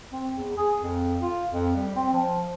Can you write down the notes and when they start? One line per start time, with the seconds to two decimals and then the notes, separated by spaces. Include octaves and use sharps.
0.12 C4
0.34 E2
0.57 G#4
0.79 F2
1.22 F4
1.50 F2
1.76 G3
1.96 C4
2.13 F3